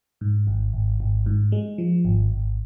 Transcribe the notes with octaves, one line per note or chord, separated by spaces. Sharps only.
G#2
G#1
G#1
G#1
G#2
G#3
F3
G#1
G#1